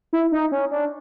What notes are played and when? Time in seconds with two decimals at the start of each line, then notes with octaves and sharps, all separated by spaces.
0.13 E4
0.32 D#4
0.52 C#4
0.71 D4